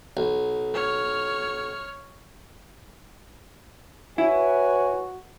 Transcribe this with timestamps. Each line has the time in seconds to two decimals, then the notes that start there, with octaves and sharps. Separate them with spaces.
0.17 B1
0.74 C#5 F6
4.18 E4 F#4 B4 C#5 G#5